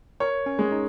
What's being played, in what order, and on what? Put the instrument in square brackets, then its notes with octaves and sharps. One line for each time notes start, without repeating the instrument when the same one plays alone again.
[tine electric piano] A#4 [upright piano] C#5
[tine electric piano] C#4
[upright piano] G#3
[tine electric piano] D#4